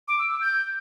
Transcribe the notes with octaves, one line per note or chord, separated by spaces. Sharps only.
D6
E6
E6
G6